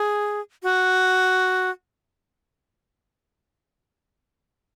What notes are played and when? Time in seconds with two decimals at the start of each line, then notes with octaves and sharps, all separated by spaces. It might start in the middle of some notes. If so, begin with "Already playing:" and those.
Already playing: G#4
0.63 F#4